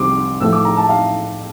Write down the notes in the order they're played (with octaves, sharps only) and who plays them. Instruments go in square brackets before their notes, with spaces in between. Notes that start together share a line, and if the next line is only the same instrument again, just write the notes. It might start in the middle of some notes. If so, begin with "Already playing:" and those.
Already playing: [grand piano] C2 C3 F3 C4 C6 D6
A2 F3 A3 E6
D6
A#5
A5
F5